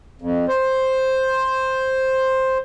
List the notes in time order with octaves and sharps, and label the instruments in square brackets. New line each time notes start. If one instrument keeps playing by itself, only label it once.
[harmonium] F2
C5